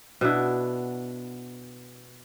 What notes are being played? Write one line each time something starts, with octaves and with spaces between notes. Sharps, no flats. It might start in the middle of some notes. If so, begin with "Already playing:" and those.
B2 B3 D4 E4